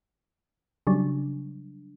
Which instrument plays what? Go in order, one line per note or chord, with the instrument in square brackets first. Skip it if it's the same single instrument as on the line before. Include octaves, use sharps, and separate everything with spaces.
[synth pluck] C#3 F#3 G3 D4